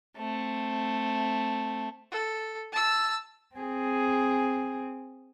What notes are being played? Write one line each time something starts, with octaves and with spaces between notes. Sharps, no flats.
A3 C4
A4
A5 E6
C4 G#4